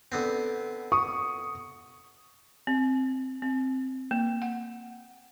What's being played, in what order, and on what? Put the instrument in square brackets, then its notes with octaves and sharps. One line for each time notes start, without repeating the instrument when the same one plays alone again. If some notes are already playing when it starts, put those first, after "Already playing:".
[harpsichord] D3 B3 C4
[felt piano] C#6 D#6
[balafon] C4
C4
A#3
F#5